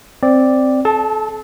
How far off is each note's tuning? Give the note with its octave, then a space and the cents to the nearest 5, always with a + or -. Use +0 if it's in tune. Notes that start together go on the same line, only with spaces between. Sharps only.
C4 +0 D5 +0
A4 -35 A5 +0